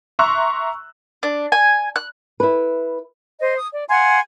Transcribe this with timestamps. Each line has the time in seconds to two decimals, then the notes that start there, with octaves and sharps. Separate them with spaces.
0.19 E5 A#5 C6 C#6 E6 F#6
1.23 D4
1.52 G#5
1.96 F#6
2.40 E4 B4
3.40 C5 D#5
3.57 D#6
3.72 D5
3.90 F5 F#5 G#5 C6